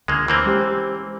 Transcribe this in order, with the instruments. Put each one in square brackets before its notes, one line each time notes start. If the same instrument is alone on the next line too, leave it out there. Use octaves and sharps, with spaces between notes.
[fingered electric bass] C#2 D3 [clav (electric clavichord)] G#3 A#3
[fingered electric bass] D2 [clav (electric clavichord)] E3 A#3 C4
[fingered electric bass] G#3 [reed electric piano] C#4 G4 C5